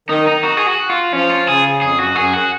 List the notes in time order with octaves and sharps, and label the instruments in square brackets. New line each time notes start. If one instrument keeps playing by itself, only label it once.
[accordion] D#3 [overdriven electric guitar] D#4
[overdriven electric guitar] D#4
F#4
G#4
F#4
F4
[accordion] F3 [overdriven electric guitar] C#4
[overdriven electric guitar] F4
[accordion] C#3 [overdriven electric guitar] G#4
[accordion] F2 [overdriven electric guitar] G#4
[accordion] F#2 [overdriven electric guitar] F#4
[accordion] F#2 [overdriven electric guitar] G#4
[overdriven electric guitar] F#4